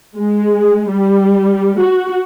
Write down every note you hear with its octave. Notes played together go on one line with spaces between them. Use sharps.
G#3
G3
F#4